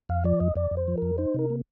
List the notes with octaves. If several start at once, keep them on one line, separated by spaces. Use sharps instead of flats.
F2 F5
F3 D5
F2 D#5
F2 D5
F2
C5
F3
F2 A#4
D#4 C5
C3 A#4
A#3